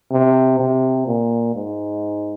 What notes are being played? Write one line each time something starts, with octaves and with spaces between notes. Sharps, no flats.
C3
C3
A#2
G#2